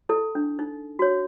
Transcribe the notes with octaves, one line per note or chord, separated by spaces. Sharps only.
E4 A4
D4
D#4
F#4 C#5